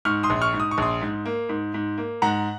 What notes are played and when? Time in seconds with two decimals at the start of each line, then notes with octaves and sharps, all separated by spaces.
0.05 G#2 C#6 F6
0.23 C6 D#6
0.30 A#1
0.41 C#6 F6
0.53 G#2
0.60 D#6
0.71 C#6
0.78 A#1 C6 D#6
1.02 G#2
1.25 A#3
1.49 G#2
1.74 G#2
1.98 A#3
2.22 G#2 F#5 A#5